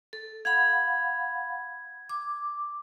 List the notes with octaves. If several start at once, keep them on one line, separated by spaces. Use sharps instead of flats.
A4
F5 F#5 B5 G#6
D6